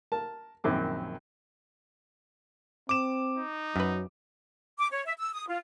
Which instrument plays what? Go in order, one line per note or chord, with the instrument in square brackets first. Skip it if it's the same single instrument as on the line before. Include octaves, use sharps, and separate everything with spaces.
[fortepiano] A#4 A5
A#1 F#2 D#3 C4 D6
[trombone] C4 [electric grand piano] D6 E7
[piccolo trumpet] D#4
[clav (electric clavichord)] F#2 B4 [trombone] F#3
[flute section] D6
C#5
E5
E6
D#6
F4